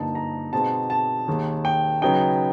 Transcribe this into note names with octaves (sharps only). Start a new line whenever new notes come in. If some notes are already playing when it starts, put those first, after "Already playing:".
Already playing: G2 D3 F3 A#3 D#4 A5
A#5
B2 G#3 C4 D#4 A5
A5
D#2 D#3 G#3
G5
C#3 F#3 B3 D#4 G5